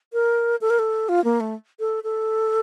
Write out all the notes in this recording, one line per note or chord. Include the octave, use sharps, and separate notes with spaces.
A#4
A4
A#4
A4
F4
A#3
A3
A4
A4